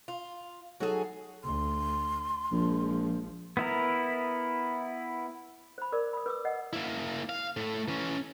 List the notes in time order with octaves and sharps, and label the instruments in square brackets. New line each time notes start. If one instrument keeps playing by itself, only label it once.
[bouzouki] F4
[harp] F#3 D#4 A4 [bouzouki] F#4 G#4
[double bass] D2 [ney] C6
[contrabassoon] A#1 [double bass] F3 G#3
[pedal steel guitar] B3 E4 A#4
[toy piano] C5 B5
A#4 D5 D6 E6
B5 D#6
B4 D6 E6
D#5 F#5
[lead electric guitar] A#3 E4
F5
A2 A3
E3 C#4